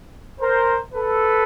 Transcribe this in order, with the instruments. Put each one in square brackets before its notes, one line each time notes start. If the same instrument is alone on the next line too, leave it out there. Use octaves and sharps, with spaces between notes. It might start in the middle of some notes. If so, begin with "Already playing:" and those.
[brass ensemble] A#4 C5
A4 B4